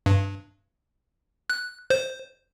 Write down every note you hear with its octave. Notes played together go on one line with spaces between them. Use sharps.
G2
F#6
C5